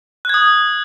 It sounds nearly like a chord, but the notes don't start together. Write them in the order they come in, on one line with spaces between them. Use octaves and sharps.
F#6 G#6 D#6